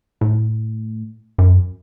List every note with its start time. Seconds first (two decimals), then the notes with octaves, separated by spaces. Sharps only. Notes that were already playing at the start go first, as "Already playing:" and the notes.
0.21 A2
1.38 F#2